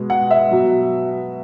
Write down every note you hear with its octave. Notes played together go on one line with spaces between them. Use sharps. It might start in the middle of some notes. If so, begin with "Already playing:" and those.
Already playing: B2 G#3
F#5
E5
B2 F#3